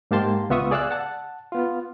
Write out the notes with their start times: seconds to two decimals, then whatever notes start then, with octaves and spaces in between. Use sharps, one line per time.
0.11 G#2 A#3 G4 A5 C6
0.50 C#2 B3 F4 E5 C#6 D#6
0.71 G#4 D5 F5 E6 F#6
0.91 F#5 A5
1.52 B3 F4